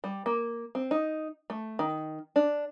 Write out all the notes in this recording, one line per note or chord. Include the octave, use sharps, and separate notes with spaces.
G3
A#3
C4
D#4
A3
D#3
D4